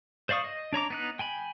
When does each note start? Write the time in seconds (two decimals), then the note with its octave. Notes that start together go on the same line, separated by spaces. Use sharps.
0.29 C5 D5 F5 C#6 D#6
0.44 D#5
0.73 D4 C#5 A#5 D6
0.90 B3 D#4 F#6
1.19 G5 G#5 B5